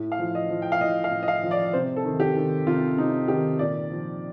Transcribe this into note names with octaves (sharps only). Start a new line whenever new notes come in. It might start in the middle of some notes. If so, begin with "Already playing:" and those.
Already playing: A2
F5
F3
D#5
F3
G5
F5
A2 D#5
F5
A2
D#5
F5
F3
D5
C3 C5
A4
D#3
G4
D#3
C3 F4
C3 D#4
D#3 G4
A#2 D5
F3